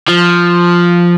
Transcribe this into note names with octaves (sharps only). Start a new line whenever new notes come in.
F3